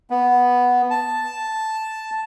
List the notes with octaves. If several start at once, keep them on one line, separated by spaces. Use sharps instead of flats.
B3
A5